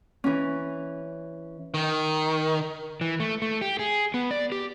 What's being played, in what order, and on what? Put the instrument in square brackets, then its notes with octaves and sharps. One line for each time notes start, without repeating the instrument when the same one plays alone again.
[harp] E3 C#4
[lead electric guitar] D#3
[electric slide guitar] E3
A3
A3
G4
G#4
B3
D5
G4